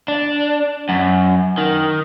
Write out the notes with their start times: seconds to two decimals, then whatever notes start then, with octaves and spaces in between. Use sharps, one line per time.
0.08 D4
0.89 F#2
1.58 D#3